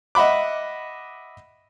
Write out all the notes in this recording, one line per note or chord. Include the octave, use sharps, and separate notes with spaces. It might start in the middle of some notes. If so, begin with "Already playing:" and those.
D#5 E5 F#5 B5 D6